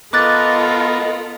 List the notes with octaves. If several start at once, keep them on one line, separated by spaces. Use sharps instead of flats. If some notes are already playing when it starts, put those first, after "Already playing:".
B3 F4 A4 A#4 D#5 D6 F#6 A6